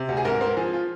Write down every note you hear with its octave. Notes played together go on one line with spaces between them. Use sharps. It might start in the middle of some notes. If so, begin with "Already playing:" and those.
Already playing: C3
D2
G#4
G#2 A#4
C4 A#4
F3 G#4
F4